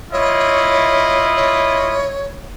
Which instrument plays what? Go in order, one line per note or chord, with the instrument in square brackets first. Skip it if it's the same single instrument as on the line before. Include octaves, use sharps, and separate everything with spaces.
[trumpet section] E4 F4 D#5 [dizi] C#5
[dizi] C#5